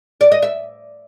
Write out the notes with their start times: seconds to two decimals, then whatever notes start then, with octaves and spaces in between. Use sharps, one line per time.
0.21 D5
0.32 D#5
0.42 E5